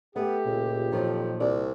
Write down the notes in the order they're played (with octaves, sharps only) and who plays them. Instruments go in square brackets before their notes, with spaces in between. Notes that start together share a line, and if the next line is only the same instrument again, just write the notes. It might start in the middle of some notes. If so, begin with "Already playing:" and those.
[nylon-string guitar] A3 [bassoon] B3 [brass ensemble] G4
[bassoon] C#2 [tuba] A#2
[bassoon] F2 [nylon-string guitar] D#3 F3 F#3
[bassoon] C2 [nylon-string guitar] D5